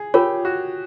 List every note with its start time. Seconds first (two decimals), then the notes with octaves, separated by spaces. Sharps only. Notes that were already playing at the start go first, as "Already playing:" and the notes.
Already playing: G#4
0.14 F4 G4 A#4 C#5
0.45 F#4